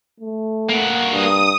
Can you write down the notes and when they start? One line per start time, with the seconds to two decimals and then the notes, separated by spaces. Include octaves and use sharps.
0.20 A3
0.69 A#3 F#4
1.12 G2 D#6